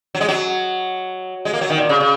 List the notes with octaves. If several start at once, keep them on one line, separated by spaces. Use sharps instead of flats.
F#3
G#3
F#3
G#3
A#3
F#3
D#3
A#2
C#3
C#3